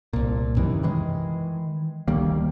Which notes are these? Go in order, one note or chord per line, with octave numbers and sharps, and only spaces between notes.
C2 A#2
F#2 C3 D#3 E3
D#3 E3 G#3
D2 D#3 G3 A#3